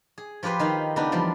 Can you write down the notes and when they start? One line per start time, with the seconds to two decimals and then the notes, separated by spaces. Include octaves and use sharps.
0.18 G#4
0.43 F3 F4 G4 B4 C5
0.59 D#3 D#4 F5
0.96 C#3 B3 D4 D#4
1.12 E2 F3 G3 G4 C6